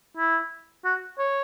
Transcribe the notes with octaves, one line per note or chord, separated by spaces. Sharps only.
E4
F#4
C#5